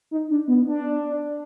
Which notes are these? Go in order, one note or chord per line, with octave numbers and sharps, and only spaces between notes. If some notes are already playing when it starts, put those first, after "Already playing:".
D#4
D4
B3
D4